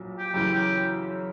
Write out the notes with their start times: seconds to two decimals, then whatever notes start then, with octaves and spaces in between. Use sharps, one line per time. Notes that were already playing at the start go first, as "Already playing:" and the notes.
Already playing: A#1 A#2 F#3
0.18 G4
0.33 F#2 C#3 E3 G4
0.54 G4